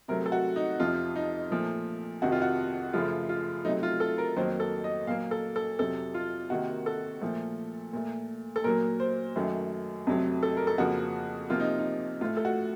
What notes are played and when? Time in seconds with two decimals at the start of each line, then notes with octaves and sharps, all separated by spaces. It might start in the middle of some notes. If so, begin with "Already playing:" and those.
0.08 C3 F#3 A3 A#4
0.26 A4
0.32 F#4
0.56 D#4
0.80 F2 C3 F3 F4
1.16 D#4
1.51 A#2 F3 A3
2.22 F2 C3 D#3 F#4
2.32 F4
2.42 F#4
2.93 F#2 C#3 F3 A3 F4
3.29 F4
3.65 C3 F#3 A3 D#4
3.83 F4
4.00 A4
4.18 A#4
4.36 F2 D#3 F#3 A#3 C5
4.60 A4
4.84 D#5
5.07 A#2 F#3 A#3 F5
5.31 A4
5.56 A4
5.79 F2 C3 F#3 A4
6.14 F4
6.50 C3 D#3 A#3 F#4
6.86 A4
7.21 A#2 F3 A3
7.93 A#2 A3
8.56 A4
8.64 A#2 F#3 A#3 A#4
9.00 C5
9.36 F#2 D#3 F#3 A3
10.07 F2 C3 F#3 A3
10.43 A4
10.57 A#4
10.67 A4
10.78 F2 C#3 F3 A#3 F#4
11.50 C3 F3 A#3 F4
11.60 D#4
11.79 D#4
12.21 A2 A3 F4
12.37 A4
12.45 F#4